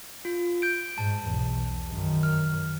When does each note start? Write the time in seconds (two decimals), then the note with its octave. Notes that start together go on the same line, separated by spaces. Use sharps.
0.25 F4
0.62 G6 D7
0.98 G#2 A5
1.27 B1 E2
1.92 F#2 D#3
2.23 F6